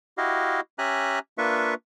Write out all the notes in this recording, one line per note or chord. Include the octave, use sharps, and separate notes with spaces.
E4 F#4 G4 D#5 F5
C#4 G4 E5 G#5 A#5 F#6
A#3 D4 F4 B4 E5 C#6